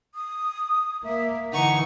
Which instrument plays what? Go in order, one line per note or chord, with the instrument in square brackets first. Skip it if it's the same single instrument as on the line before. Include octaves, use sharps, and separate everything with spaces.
[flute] D#6
[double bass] A#3 [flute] E5
[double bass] D3 E3 [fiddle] D#4 C#6 [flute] F#5